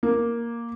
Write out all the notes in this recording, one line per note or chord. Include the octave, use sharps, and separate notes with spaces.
A#3